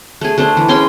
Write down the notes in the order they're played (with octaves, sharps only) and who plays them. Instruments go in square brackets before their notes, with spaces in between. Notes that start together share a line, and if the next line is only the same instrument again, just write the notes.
[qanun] A3 G#4
A3 D4 C5
E3
G#3 C#4 G5 C6